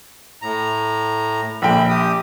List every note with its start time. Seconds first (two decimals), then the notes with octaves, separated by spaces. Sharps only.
0.42 A2 A#5
1.62 A#1 D3 E5 G5 B5
1.89 G4 D#6